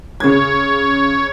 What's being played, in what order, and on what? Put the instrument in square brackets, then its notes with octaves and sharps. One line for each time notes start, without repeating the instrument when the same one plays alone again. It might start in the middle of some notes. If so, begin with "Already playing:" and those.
[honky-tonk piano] C#3 G#6 [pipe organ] C#5